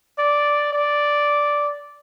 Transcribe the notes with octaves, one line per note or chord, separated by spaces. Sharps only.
D5
D5